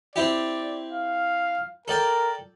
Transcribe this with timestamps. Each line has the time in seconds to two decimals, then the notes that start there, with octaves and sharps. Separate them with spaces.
0.16 C4 E4 G4 D5
0.92 F5
1.88 A4 A#4 D5 G5